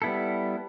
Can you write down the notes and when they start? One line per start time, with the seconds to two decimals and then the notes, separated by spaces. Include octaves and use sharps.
0.02 G3 B3 E4 A4